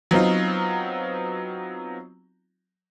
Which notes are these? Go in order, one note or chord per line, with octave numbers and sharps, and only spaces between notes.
F#3 B3 C4 D#4 F4